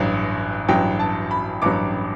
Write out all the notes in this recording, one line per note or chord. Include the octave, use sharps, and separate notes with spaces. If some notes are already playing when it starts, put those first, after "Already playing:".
Already playing: A1 G2 F#3
A1 G2 F#3 G5
A5
B5
A1 G2 F#3 D6